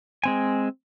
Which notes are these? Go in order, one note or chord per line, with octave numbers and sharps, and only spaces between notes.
G#3 C4 G#5